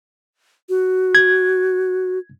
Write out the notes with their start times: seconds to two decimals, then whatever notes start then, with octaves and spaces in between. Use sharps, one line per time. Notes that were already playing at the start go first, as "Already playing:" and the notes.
0.69 F#4
1.15 G#6